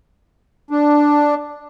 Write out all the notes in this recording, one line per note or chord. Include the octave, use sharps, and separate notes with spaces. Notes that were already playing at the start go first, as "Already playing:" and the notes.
D4